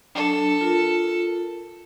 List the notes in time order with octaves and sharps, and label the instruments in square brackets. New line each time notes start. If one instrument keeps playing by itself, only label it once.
[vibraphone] F#3 D4 [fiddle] A4
[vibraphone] F4 A#4